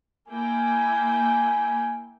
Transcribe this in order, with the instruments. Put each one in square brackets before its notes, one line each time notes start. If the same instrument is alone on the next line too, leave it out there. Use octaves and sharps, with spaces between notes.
[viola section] A#3 E4 G5 [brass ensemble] G#5